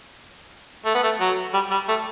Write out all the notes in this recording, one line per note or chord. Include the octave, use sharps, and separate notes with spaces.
A3
B3
A3
F#3
G3
G3
A3